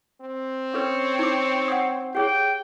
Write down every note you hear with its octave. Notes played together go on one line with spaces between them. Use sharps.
C4
C#4 A4 B4 C#5
D#4 D6
F#5 G5 D#6
G4 G#4 C#5 G5